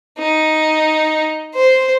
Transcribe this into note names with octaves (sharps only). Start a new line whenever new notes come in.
D#4
C5